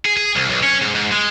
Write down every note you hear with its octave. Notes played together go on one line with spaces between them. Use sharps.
G#4
G#4
C2
B1
C#4
G#2
G#2
G#3